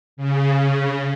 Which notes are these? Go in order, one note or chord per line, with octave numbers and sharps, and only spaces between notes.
C#3